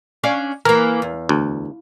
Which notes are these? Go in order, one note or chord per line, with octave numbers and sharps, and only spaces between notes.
C#4 D4 F5
E3 A#3 A#4
E2
D2